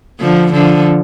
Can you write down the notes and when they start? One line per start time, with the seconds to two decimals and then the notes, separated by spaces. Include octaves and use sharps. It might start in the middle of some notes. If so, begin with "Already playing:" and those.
0.20 D3 F3
0.53 D3 F3